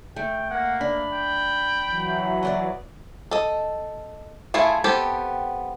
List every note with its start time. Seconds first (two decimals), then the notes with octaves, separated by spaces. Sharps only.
0.16 A3 G5
0.50 A#3 F#5
0.81 D4 B5
1.12 G5
1.87 E3 F#3
2.43 B4 D5 D#5
3.31 A4 D#5
4.54 A3 E4 F4 G#4 A4
4.84 B3 C4 G4 A4